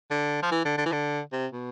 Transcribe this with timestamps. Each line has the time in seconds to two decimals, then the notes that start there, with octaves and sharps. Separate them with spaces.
0.11 D3
0.43 F3
0.52 E3
0.65 D3
0.78 D3
0.86 E3
0.92 D3
1.33 C3
1.52 B2